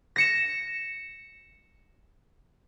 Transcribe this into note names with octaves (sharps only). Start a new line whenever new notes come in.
A#6 C#7 E7